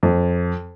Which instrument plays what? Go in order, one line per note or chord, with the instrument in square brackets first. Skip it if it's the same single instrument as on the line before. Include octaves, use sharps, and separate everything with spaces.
[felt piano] F2